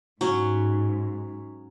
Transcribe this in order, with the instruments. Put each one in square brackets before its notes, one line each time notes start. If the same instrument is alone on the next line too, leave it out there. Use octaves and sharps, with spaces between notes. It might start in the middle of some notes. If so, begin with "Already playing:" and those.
[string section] G#2 [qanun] F#3 C#4